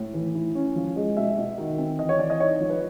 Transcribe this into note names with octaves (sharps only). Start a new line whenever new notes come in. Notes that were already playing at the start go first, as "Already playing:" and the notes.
Already playing: A2
E3
E4
C#4
F3
G#3
B2 E5
B2
D#3
C4
E3 D#5
C#5
E3 D5
D#5
D#4 C#5
F3
B4